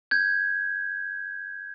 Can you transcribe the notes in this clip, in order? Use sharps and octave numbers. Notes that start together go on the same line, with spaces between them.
G6 G#6